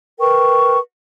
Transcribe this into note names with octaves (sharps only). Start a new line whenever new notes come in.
A#4 B4 G5 C#6